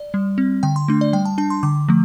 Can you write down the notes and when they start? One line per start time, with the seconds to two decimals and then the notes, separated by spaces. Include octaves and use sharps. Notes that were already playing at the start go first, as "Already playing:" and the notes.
Already playing: D5
0.14 G3
0.38 C4
0.63 D3 G5
0.76 C6
0.88 A3 D4
1.01 D5
1.13 G3 G5
1.25 A5
1.38 D4 A5
1.50 C6
1.63 D3 D6
1.89 F3 A3